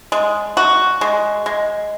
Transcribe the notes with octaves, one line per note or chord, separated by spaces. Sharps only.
G#3
F#4
G#3
G#3